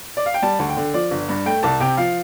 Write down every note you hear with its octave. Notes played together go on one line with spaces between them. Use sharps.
D5
F5
G5
G3 A5
D2
G5
D3
F3 D5
G1
G2
A3 G5
C2 A5
C3 G5
F3 F5